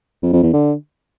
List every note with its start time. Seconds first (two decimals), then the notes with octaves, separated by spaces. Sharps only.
0.23 F2
0.33 F2
0.43 E2
0.53 D3